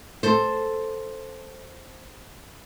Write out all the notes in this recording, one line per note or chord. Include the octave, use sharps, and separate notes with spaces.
A4 C5